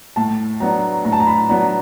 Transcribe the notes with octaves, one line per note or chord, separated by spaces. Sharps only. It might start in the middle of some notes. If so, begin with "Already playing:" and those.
A2 A5
F#3 B3 D4 A#5
A2 A#5
A5
A#5
B5
F#3 B3 D4 A#5